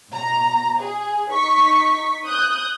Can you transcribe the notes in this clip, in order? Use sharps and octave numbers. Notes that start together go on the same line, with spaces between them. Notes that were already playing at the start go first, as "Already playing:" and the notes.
B2 A#5
G#4
D#4 C#6 B6
D#6 F#6 G6